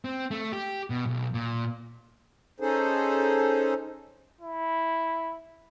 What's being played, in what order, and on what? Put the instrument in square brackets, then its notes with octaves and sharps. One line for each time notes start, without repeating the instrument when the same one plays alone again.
[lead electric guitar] C4
A3
G4
B2
B1
A#2
[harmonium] C#4 D#4 G#4 A4 C5
[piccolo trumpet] E4